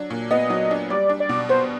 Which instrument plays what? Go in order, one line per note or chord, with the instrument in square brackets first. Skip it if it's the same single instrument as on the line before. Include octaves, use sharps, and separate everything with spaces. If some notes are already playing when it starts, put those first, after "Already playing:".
Already playing: [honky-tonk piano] F#3 D4
A#2
[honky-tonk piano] B3 [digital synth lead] D#5
[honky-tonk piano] F#3
D4
[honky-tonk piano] G3 [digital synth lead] D5
[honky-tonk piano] D4
[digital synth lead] D5
[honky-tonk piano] B2
[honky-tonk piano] B3 [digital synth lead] C5